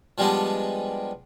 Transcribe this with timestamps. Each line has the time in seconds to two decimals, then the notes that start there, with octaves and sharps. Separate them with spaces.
0.18 F3 G3 G#3 B3 D4